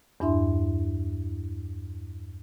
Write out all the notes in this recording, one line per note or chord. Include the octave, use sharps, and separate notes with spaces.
E2 G2 D4 E4 E5 C6